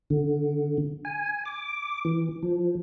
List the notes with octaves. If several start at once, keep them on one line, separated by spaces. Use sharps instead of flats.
D3
G#5
D6
E3
F3